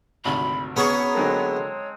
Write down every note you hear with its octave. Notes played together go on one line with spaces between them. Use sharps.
G#1 D2 C3 B5
F#3 B3 C#4 D#4 G#4 C#5 C#6
D3 F#3 G#3 A#3 C4 A5